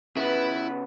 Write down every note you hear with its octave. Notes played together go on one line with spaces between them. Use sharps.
C#3 B3 E4 B4